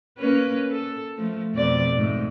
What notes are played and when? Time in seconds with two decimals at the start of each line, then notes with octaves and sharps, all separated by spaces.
0.18 A#3 C#4 B4
0.71 A4
1.17 F3 A3
1.55 F2 B2 D5
1.96 G#2 A3